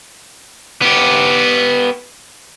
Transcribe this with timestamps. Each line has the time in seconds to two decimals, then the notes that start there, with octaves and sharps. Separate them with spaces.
0.82 B3 G4